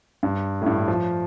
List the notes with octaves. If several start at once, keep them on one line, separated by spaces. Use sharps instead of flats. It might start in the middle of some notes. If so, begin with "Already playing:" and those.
G2
A2
G2
A2
F3